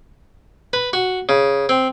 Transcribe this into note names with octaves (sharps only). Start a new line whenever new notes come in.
B4
F#4
C#3
C4